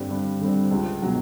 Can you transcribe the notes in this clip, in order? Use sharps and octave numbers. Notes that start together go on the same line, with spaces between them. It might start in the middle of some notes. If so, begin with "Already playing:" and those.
Already playing: G2 D3 G3 C4
G2
D3 G3 C4
C#2
B2 F#3